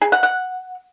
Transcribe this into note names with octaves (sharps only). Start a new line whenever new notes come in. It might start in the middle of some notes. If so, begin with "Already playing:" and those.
G#4
F#5
F#5